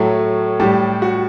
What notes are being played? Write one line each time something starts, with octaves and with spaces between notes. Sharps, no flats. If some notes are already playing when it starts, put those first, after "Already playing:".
Already playing: A2 F#3 A3 C#5
A2 G3 G4
F#4